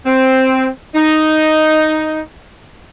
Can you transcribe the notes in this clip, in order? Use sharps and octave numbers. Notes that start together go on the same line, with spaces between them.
C4
D#4